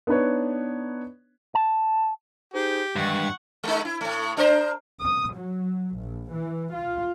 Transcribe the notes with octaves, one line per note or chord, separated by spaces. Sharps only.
B3 D4 D#4 B4 C#5
A5
D#4 G4 G#4 C5
G2 D#3 E3 G#3 F#5 C#6
G#3 D#4
E4
A2 A3
D4 A#4 C5
D#6
F#3
A#1
E3
F4